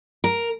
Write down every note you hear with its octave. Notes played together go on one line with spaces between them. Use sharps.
A#4